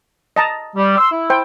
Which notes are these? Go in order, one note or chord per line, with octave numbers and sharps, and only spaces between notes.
D#5 A5 A#5
G3
C6 E6
E4
C5 G5